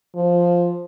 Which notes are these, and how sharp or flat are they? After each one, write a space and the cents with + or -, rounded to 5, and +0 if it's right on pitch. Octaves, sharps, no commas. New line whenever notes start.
F3 +0